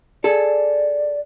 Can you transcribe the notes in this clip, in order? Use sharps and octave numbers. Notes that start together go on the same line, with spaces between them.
G#4 A4 D5